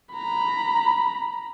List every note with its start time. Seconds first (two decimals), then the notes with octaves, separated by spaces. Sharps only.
0.14 A#5 B5